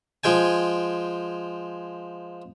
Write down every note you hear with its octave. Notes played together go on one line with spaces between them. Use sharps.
F3 G#3 G5 G#5